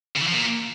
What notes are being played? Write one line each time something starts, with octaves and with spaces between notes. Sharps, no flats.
C#3
E3
F3
A#2